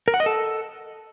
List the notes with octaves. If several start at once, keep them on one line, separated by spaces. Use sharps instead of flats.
A#4
F#5
D#5
A4